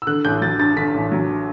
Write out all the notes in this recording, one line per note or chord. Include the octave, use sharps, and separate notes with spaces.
E6
D3 F#6
A1 G6
F#3 A6
G2 A6
D3 B6
A1
F#3